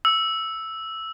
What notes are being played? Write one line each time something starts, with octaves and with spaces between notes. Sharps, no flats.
E6